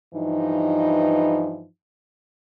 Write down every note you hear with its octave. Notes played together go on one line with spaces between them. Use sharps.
G2 E3 F3 D#4